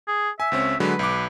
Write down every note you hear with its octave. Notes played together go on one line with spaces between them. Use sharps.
G#4
E5 G#5
C#2 C4 C#4
D3 F#3 G#3 B4
B1 D6